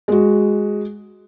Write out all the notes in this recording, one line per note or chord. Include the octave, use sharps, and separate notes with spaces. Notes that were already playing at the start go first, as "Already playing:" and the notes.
G#3 F#4